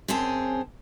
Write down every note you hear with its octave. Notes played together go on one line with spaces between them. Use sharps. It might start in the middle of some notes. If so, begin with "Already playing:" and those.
F#2 C4 C#4 G#4 A5